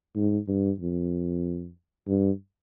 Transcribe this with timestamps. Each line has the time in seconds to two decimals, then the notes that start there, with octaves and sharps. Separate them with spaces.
0.16 G#2
0.48 G2
0.80 F2
2.08 G2